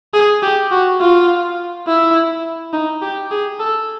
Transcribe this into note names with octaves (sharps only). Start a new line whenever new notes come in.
G#4
G4
F#4
F4
E4
D#4
G4
G#4
A4